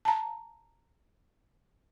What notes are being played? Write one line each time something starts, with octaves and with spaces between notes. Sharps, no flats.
A5 A#5